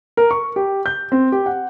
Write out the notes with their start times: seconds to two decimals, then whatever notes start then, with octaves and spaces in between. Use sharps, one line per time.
0.17 A#4
0.31 C#6
0.56 G4
0.86 G6
1.12 C4
1.32 G4
1.46 F#5